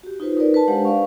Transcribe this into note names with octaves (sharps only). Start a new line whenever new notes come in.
F#4 G4
D#4 F4 B4 C5
D#4 A#4 B4 D5
B4 A5
G#3 D4 G4 C5 F5 F#5
B4 D5 F5 C#6